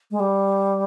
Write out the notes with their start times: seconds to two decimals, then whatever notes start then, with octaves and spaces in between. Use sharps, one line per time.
0.11 G#3
0.20 G3